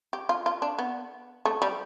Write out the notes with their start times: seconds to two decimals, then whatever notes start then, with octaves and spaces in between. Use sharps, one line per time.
0.13 G4
0.29 F4
0.46 F4
0.62 D4
0.79 B3
1.45 A3
1.62 G3